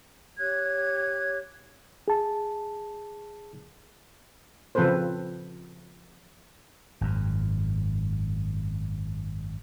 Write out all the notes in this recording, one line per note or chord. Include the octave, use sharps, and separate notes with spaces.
G4 C#5 F#6 G#6
G#4 A5
C#3 F3 C4 A4 B4 C5
G#1 F#2